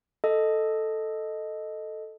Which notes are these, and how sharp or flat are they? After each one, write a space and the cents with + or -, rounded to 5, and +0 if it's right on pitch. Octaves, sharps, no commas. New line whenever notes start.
A4 +0 D#5 +0